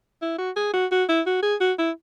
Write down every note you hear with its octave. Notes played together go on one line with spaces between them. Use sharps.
E4
F#4
G#4
F#4
F#4
E4
F#4
G#4
F#4
E4